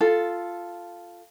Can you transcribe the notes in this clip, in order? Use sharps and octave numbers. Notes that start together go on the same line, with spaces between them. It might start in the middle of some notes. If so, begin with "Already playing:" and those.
F4 A4